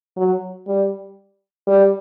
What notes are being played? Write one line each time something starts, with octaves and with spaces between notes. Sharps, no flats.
F#3
G3
G3